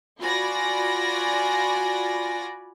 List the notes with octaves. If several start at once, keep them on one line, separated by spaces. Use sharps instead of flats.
F4 F#4 D5 G#5 B5 A#6